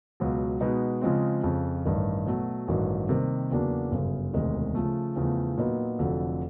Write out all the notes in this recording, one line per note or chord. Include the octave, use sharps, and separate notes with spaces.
C#2 B2 F#3
B2 G#3 B3 D#4
C#3 F3 G#3 C4
F2 C#3 F3
A1 G2 D#3
B2 F#3 A3
A1 G2 D#3 F#3
C3 D#3 G3 A#3
E2 C#3 F#3 A#3 D4
G1 F#2 C#3
E1 D2 C3 D#3 G#3
C#3 F3 A3
E2 C#3 F3 A3
A#2 F#3 B3 D#4
F1 F2 D3 F#3